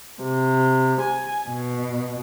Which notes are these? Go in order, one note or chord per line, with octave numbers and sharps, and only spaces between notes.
C3
G#5
B2